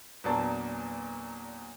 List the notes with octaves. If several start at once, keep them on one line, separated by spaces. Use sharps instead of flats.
E2 A#2 F#3 A#3 D4 A5